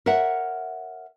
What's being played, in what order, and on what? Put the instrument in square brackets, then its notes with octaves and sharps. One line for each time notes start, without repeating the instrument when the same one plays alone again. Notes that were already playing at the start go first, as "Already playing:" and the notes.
[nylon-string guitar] A#4 C#5 E5 F#5